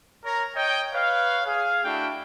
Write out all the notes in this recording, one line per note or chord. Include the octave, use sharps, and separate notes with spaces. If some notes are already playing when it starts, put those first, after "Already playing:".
A#4 C#5 A#5
C#5 D#5 G5
B4 C#5 F5
G#4 F5
A3 D4 E4 F#4 G5